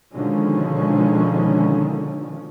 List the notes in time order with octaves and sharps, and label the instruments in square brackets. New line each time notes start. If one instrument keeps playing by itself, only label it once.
[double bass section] B2 D3 D#3 F3 G#3 C#4